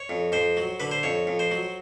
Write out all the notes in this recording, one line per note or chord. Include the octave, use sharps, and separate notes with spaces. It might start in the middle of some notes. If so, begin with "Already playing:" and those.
Already playing: C#5
F2
F2 C5
F#3
D3 B4
C5
F2 C#5
F2
C5
F#3